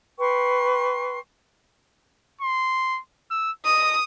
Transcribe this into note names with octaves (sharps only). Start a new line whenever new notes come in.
B4 G5 C6 C#6
C6
E6
D#5 D#6